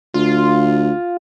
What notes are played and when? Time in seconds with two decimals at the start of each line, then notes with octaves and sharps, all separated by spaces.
0.14 D2 F4